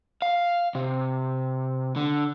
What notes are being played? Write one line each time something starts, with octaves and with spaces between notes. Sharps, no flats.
F5
C3
D3